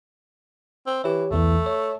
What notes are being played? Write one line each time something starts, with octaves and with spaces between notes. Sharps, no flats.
C4
E3 G4 C#5
B1 E2 E3 A3
C#5